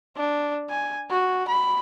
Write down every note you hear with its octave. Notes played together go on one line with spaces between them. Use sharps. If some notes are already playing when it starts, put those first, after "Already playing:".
D4
G#5
F#4
B5